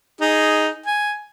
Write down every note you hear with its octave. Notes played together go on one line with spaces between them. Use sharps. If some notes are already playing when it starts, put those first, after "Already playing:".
D#4 G#4
G#5